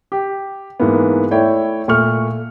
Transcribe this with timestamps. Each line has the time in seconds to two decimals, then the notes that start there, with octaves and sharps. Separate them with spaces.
0.12 G4
0.80 G#2 E3 A#3 B3
1.31 A3 E4 C#5 D5 G5
1.88 A#2 A3 C#6 F6